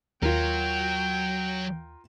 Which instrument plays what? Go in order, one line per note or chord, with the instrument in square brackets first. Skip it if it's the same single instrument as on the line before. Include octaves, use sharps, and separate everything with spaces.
[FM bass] D#2 [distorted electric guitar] F#3 [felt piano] F4 A#4 [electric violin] G5